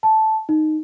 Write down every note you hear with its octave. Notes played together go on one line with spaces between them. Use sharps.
A5
D#4